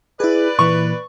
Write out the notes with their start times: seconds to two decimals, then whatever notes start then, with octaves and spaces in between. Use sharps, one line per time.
0.20 E4 G#4 B4 D5
0.59 A#2 E3 C#6